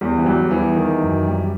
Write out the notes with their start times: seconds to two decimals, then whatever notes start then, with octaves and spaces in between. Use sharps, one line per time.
0.01 E2 G3
0.19 E3
0.26 F#3 G3
0.51 E2 E3
0.76 D#3
1.02 F#2
1.27 G3